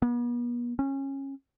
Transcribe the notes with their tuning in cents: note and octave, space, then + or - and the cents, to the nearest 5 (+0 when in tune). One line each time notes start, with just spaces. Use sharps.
B3 -40
C#4 -20